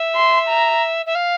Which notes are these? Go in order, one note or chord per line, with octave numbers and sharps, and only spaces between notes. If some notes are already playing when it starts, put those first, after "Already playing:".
Already playing: E5
C6
A#5
E5
F5